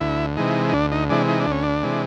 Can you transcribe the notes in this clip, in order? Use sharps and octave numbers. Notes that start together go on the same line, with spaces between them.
D2 E4
C3 E3 G#3 D#4
D#4
D2 D4
D#4
C3 E3 G#3 D4
D#4
D4
D2 C#4
D4
C3 E3 G#3